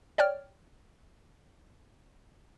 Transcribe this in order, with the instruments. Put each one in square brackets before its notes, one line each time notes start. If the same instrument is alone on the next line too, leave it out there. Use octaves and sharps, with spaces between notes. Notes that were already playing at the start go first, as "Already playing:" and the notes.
[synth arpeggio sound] C#5 D5 G5 F6